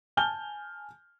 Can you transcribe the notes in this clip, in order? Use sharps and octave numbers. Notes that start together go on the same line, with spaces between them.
G#5 A5 F6 G6 G7